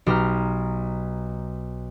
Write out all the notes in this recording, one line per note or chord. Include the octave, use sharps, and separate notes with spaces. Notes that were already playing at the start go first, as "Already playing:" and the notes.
B1 G4 A#5 F6